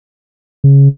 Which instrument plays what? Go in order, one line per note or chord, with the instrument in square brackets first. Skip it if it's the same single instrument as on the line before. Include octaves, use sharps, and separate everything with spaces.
[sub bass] C#3